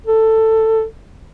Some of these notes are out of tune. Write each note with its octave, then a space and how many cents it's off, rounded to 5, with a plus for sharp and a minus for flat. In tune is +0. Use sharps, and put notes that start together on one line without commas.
A4 +10